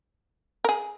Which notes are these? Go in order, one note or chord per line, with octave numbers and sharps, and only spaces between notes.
A#4
G#4